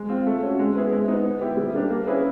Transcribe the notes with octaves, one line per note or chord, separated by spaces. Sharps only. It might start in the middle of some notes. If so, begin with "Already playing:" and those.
Already playing: G#3
C4 F4
A3
C#4 F#4
G#3
B3 E4 G#4
G#3
B3 D#4
B3
E4 G4
G3
A#3 D4 G4
A#3
C#4 E4 G#4 B4